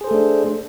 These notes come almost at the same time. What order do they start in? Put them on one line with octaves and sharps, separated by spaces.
G#4 C5 A4 A3 D4